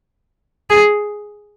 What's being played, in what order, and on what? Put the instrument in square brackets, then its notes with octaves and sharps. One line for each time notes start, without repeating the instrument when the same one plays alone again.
[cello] G#4